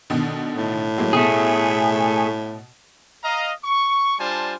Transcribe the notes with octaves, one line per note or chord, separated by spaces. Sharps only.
B2 D3 D#3
A2
F#3 G#3 A#3
B2 A3 G#4
D#5 F5 A#5
C#6
G3 D4 F4 C5 G#5 A5